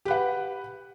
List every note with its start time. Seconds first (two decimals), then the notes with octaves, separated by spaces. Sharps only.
0.05 G4
0.08 B4
0.11 F#5